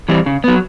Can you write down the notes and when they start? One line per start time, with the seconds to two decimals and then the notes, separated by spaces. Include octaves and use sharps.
0.09 E3 G3 C4
0.26 C#3
0.44 F#3 B3